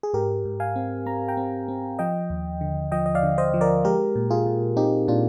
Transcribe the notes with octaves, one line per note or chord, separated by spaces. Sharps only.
G#4
G#2 G4 A#4
G#2
F5 G#5
C4
C4 A#5
G5 A#5
C4
C4
F3 D#5 G5
D#2
D3
F3 D#5 G5
D#5
D5 F5
D3
C5 D#5
F3
A#4 D5
G#3 G4 A#4
A#2
F4 G#4
A#2
C4 D#4 G4
A#2 D4 F4